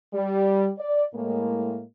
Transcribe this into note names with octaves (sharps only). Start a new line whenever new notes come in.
G3
D5
A2 G#3 A#3